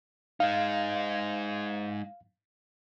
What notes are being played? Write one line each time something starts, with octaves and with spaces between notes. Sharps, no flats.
G#3 D#4 F5